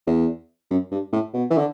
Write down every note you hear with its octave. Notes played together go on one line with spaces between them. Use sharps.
E2
F#2
G2
A2
B2
E3
D3